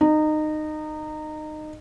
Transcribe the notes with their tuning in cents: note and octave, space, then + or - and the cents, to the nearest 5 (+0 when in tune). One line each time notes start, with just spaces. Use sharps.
D#4 -20